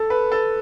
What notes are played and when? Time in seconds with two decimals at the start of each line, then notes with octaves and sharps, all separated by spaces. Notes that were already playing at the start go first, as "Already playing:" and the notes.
Already playing: A4
0.10 B4
0.32 A4